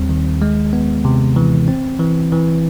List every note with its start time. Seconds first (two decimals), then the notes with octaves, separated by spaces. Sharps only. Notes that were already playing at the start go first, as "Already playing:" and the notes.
Already playing: D#2 G3 C4
0.09 D#3
0.42 G#3
0.73 B3
1.05 C3
1.36 E3
1.68 C4
2.00 E3
2.32 E3